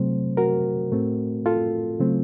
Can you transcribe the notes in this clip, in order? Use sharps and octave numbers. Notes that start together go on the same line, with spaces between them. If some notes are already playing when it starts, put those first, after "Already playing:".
Already playing: C3 F#3 A3 C4 C5
F#4 A#4
A2 A3 C4
F4 A4
C#3 F#3 A3 C4